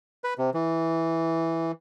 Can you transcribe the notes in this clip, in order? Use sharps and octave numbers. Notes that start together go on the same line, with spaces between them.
B4
C3
E3